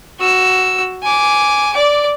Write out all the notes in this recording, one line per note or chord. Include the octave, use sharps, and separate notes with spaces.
F#4 E6
G#5 D6
D5 D6